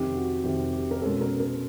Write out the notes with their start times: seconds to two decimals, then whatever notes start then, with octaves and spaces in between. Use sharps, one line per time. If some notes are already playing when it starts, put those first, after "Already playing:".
Already playing: F2 C3 D#3 G4
0.16 F#4
0.44 F2 C3 D#3 G4
0.73 G4
0.91 A#4
1.02 B2 G#3 C#4 A4
1.21 A#4
1.40 A#4